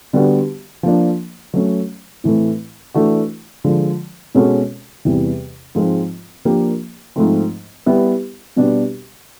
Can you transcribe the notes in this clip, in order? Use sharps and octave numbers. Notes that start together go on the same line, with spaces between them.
D3 G3 B3 D4 F#4
F3 A#3 D4
F#3 A3 C#4
A2 E3 A3 C4
E3 A3 D4 F#4
D3 F3 G#3
B2 G#3 C#4 F#4 A4
E2 C3 E3 G3
G#2 F3 G#3 C4 F4
F3 A#3 D4 G4 A#4
G#2 F3 A3 C4
G3 B3 E4
B2 G3 B3 D4 F#4